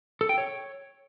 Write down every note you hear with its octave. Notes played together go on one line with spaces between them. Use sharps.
A4
G5
C#5